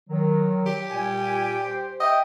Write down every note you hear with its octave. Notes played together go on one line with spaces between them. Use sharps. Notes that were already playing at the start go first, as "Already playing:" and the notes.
D#3 F#3
G4
A#2 G3 G#5
C5
D#5 E5 G5